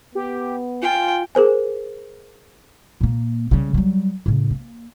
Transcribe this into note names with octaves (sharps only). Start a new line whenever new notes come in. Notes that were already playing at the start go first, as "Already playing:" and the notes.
B3 G4
F4 G5 G#5
G#4 A#4 C5 G#5
A#2 A#3
C#3 G3
F#3 G3
A2 C#3
A#3